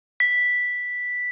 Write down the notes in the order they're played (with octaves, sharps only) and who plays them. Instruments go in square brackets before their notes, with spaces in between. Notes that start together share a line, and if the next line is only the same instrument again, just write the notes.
[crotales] B6